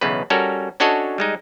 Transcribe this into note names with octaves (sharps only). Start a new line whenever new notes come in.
B1 E2 C#3 B4
G3 C#4 F#4 A4 A#4
C#4 D4 F#4 A4 C#5 D#5
G3 G#3 D#4